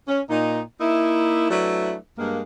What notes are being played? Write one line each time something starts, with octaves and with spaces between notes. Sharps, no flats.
C#4
A#2 D#4
A#3 D#4 E4
F#3 A3 D4 E4 B4
G2 G#3 A#3